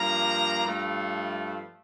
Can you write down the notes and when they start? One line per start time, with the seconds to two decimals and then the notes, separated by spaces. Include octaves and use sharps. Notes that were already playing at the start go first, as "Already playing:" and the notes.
Already playing: G2 F3 A#3 A#5
0.66 G2 F3 A3